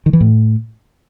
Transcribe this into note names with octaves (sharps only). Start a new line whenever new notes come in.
D#3
E3
A2